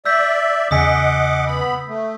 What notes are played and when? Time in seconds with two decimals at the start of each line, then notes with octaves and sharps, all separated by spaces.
0.05 D5 E5 E6 G6 B6
0.71 E2 C#3 D#5 F#5 G#5 D6 D#6 B6
1.47 B3 B5
1.88 A3